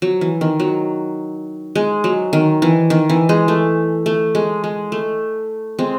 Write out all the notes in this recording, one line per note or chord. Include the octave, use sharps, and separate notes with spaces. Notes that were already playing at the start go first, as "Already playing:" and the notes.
F#3
E3
D#3
F#3
G#3
F#3
D#3
E3
D#3
E3
G#3
A3
A3
G#3
G#3
A3
G#3 C4